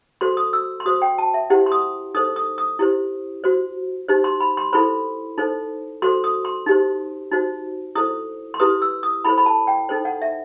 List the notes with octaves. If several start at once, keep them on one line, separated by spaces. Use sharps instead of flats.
F#4 A4 C5 C6
D#6
E6
C6
F#4 C5 D#6
G5
A5
E5
E4 G4 C5 F#5
C6
D#6
D#4 A4 C5 D#6
D#6
D#6
E4 G4 C5
F#4 C5
D#4 G4 C5
C6
B5
C6
E4 A4 C5 B5
D#4 A4 C5
F#4 A4 C5 C6
D#6
C6
D#4 G4 C5
D#4 F#4 C5
E4 A4 C5 D#6
C6
E4 G4 B4 D#6
E6
D#6
E4 A4 C5 B5
B5
A5
G5
D#4 A4 C5
F#5
E5